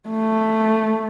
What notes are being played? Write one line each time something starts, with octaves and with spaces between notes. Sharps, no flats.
A3